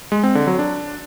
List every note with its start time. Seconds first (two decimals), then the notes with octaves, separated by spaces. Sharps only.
0.12 G#3
0.23 C4
0.35 D3
0.47 F#3
0.59 D4